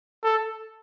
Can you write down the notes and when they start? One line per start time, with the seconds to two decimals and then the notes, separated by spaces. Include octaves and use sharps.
0.24 A4